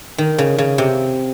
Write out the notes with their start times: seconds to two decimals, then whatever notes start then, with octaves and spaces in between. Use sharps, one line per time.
0.18 D#3
0.38 C#3
0.58 C#3
0.78 C3